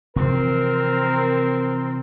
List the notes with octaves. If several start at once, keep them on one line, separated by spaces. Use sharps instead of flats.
C3 E3 F3 C4 A#4